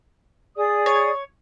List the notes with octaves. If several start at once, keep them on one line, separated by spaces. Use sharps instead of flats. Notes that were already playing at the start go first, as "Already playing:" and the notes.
G#4 D5 D#6
C#5